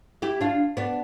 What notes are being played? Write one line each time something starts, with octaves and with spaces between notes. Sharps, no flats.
E4 G4
D4 F4
B3 D4